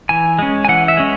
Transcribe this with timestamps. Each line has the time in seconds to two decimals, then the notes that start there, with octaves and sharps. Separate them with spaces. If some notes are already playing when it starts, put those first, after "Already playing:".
0.09 E3 G#5
0.39 G#3 C#4
0.65 G#5
0.68 E3 F#5
0.88 E5
0.97 G#3 C#4